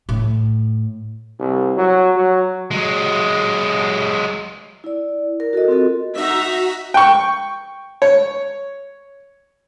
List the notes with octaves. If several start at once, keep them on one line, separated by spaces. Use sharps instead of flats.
A2
C2
F#3
F#3
F#3 G#3
E4 D5
A#4
F#4 A4 A#4 D#5
C4 F4 F#4 A4
D#4 F#4 E5 A#5 B6
G5 C#6
C#5